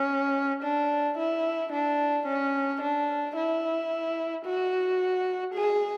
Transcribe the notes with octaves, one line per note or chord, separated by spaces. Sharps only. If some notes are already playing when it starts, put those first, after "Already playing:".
Already playing: C#4
D4
E4
D4
C#4
D4
E4
F#4
G#4